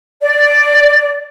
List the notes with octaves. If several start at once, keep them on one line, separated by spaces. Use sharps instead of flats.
D5